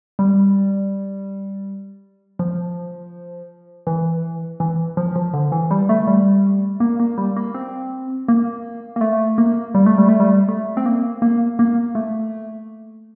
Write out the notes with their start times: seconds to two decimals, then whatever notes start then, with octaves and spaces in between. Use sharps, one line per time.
0.19 G3
2.39 F3
3.87 E3
4.60 E3
4.97 F3
5.16 F3
5.34 D3
5.52 E3
5.71 G3
5.89 A3
6.07 G3
6.80 A#3
7.00 A#3
7.18 G3
7.37 A#3
7.55 C4
8.28 A#3
8.96 A#3
9.01 A3
9.38 A#3
9.75 G3
9.86 A3
9.98 G3
10.08 A3
10.20 G3
10.49 A3
10.77 C4
10.86 A#3
11.22 A#3
11.59 A#3
11.95 A3